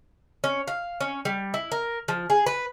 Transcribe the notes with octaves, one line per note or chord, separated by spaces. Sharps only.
C#4
F5
C#4
G3
E4
A#4
F3
G#4
B4